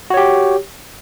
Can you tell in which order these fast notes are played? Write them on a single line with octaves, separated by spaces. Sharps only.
F#4 C#5 G4